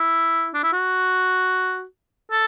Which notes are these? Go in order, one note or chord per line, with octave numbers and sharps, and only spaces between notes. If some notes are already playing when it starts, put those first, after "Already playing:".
Already playing: E4
D4
E4
F#4
A4